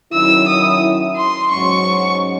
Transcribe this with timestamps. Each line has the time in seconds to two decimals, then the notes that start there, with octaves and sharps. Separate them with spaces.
0.13 D#3 F#3 C#4 E4 E6
0.48 D#6
1.16 C6
1.51 G#2 F#3 C#4 C#6